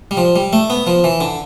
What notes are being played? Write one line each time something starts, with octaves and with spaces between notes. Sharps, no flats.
G3
F3
G3
A3
B3
F3
E3
D3